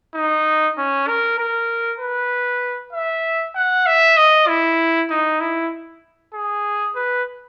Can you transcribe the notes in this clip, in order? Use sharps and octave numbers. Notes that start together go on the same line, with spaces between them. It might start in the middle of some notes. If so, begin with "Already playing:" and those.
D#4
C#4
A#4
A#4
B4
E5
F#5
E5
D#5
E4
D#4
E4
G#4
B4